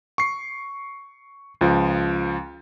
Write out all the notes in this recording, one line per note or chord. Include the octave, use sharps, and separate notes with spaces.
C#6 C7
C#2 F3